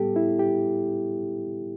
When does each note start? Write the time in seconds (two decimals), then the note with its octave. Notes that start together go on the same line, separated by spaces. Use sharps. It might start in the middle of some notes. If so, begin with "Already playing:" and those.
Already playing: A2 G3 B3 G4 A4
0.16 E4
0.39 G4